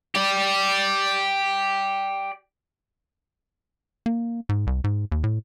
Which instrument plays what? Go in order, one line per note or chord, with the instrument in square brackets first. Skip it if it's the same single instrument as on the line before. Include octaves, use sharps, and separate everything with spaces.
[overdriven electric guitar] G4 D5
[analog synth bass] A#3
G#2
C2
G#2
D#2
A2